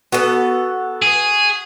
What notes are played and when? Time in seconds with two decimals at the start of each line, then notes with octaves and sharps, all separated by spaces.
0.12 B3 F#4 A4
1.02 G#4